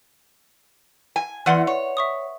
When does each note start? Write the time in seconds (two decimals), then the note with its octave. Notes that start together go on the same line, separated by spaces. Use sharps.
1.16 G#5
1.46 E2 E3 B4 D5 F#5 C6
1.67 C#5
1.97 E5 C#6 D#6